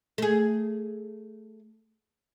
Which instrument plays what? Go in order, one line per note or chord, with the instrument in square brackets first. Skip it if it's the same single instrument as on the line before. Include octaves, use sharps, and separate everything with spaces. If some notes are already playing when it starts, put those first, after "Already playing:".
[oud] A3 G#4